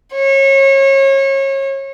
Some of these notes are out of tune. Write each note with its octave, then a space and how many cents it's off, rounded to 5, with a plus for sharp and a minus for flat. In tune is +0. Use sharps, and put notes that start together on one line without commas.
C#5 -30